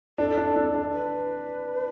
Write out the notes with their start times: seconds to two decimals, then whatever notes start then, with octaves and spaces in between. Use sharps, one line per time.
0.18 D4 A4
0.37 D4
0.56 D4
0.75 D4
0.92 B4